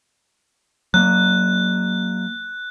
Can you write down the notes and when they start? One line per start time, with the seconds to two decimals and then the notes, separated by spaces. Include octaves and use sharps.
0.94 F#3 A#3 F#6